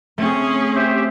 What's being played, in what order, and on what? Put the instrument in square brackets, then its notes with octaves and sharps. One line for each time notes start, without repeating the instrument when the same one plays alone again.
[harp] A3 C4 [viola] C#4 G#4
[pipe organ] G4 C5 E5